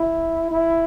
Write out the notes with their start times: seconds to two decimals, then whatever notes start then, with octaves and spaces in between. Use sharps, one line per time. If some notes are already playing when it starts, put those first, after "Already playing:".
Already playing: E4
0.51 E4